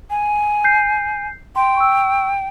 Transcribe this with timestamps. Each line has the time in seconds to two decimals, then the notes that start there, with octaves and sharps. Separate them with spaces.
0.10 G#5
0.64 G6 C7
1.56 G5 C6
1.77 C#6 E6